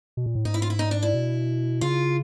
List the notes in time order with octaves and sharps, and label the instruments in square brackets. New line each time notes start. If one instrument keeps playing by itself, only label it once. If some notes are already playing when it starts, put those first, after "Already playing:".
[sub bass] B2
A#2
A2
[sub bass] G#2 [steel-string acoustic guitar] D#4
[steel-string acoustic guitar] E4
F4
E4
D#4
D4
E4
[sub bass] B2
[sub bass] C#3 [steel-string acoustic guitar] F4